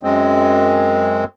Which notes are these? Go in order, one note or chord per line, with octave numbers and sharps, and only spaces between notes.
F#2 G#3 C4